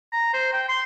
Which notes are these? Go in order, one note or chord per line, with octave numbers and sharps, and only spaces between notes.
A#5
C5
G5
C6